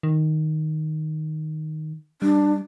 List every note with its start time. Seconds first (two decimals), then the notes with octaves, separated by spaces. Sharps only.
0.03 D#3
2.22 G3 D4